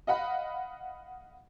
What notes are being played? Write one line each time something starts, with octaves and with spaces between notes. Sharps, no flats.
D#5 F5 F#5 B5